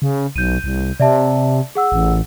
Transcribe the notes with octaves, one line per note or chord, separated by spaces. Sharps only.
C#3
B1 G6 D#7
C2
C3 D5 E5 A5
G#4 F#5 E6
A1